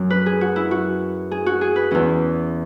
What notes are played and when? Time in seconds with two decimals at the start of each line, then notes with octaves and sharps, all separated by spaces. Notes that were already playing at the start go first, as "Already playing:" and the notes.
Already playing: F#2 F#3
0.10 B4
0.26 G#4
0.41 F#4
0.56 E4
0.71 F#4
1.31 G#4
1.46 F#4
1.61 G#4
1.76 B4
1.91 E2 E3 C#4